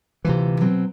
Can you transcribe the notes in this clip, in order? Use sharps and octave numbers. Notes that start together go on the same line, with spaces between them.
D2 C3 E3 F4 C5
B2 F#3 C4